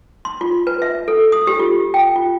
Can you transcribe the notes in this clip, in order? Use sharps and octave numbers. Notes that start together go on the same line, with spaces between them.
C6
F4
B4
E5
A4
D#6
G4
F4
G5
F4